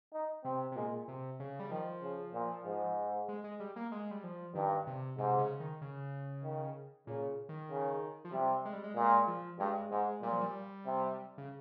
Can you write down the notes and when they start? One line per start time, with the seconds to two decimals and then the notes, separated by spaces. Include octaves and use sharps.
0.13 D#4
0.44 C3 C4
0.72 C3
0.76 A#2 G#3
1.08 C3
1.40 C#3
1.60 G3
1.71 D#3 F3
2.02 C#3
2.34 A#2
2.66 G#2
3.28 G#3
3.44 G#3
3.60 G3
3.76 A#3
3.92 G#3
4.11 G3
4.24 F3
4.55 G2 D#3
4.87 C3
5.18 G#2 C3
5.38 C#3
5.60 D#3
5.81 C#3
6.44 D#3
7.07 A#2 C#3
7.49 D#3
7.70 C#3
8.25 F3
8.33 C3 G3
8.65 G#3
8.73 G3
8.84 G#3
8.96 A#2 G#3
9.28 F3
9.60 G2 G#3
9.91 G#2 G#3
10.22 A#2 G3
10.32 F3
10.41 G3
10.86 C3
11.38 C#3